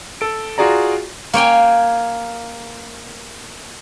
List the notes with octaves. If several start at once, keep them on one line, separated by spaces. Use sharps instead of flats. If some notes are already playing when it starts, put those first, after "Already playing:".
A4 D7
F4 F#4 G#4 D5 A#5
A#3 C#5 G5 G#5